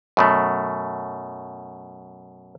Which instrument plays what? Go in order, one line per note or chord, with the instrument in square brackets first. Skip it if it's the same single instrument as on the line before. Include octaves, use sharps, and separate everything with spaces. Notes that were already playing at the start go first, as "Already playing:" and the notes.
[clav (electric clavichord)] F#2 B2 A3